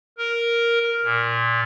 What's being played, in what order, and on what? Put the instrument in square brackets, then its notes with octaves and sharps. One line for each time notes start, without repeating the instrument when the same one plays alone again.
[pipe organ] A#4
A#2